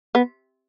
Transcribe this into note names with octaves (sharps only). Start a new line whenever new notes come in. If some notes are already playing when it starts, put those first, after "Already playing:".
B3